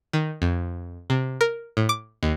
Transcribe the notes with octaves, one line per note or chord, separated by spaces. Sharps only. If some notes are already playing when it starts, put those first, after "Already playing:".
D#3
F2
C3
A#4
A2
D6
D#2